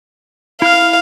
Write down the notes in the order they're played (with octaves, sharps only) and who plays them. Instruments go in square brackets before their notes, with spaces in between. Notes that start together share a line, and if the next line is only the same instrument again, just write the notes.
[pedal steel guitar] E4 F6 [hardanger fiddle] F5